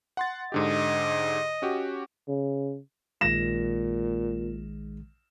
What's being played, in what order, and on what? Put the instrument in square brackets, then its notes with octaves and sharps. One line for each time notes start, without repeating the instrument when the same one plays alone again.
[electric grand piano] F#5 C6 A6
[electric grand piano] G#2 D3 G4 [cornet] D#5
[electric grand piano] C#4 F#4 G4
[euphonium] C#3
[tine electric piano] A#1 D#3 G#3 [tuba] A#2 [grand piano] A#6 E7